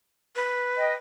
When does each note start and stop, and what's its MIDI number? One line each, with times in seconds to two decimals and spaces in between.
0.36 0.94 71
0.78 0.95 75
0.78 0.95 79